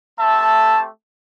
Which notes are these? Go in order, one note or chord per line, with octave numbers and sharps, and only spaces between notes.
A3 C4 G4 E5 A5